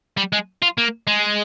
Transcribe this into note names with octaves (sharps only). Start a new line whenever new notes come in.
G3
G#3
F4
A#3
G#3